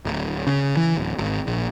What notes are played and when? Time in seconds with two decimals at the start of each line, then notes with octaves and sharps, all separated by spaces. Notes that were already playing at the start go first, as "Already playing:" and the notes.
0.05 D1
0.47 C#3
0.77 E3
0.97 D1
1.18 G#1
1.47 A#1